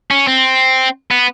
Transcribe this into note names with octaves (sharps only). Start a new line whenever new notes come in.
C#4
C4
B3